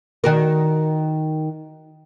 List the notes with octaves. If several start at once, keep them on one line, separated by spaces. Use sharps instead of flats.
D#3 F#4 A#4